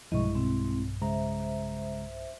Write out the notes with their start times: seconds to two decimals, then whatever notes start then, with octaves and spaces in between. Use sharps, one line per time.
0.12 B1 G2 B2 F3 G#3 E4 D#5 C#6
0.35 B2 C4
1.01 C#3 G#3 C5 E5 A#5